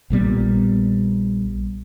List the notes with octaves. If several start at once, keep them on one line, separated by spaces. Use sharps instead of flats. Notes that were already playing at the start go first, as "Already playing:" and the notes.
A#1 A#2 G3 B3